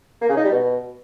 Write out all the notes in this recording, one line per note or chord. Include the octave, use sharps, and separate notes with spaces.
A#3
C#3
D#4
G3
B2